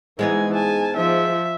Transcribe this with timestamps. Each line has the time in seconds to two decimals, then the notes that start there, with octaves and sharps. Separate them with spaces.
0.19 G#2 E3 G#3 B3 D#4 G#5
0.55 G#5 A5
0.96 G#2 F3 E5